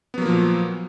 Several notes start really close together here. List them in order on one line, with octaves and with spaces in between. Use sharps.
B3 F#3 A#3 F3 A#2